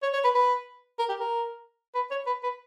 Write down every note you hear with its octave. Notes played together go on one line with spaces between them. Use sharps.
C#5
C#5
B4
B4
A#4
G4
A#4
B4
C#5
B4
B4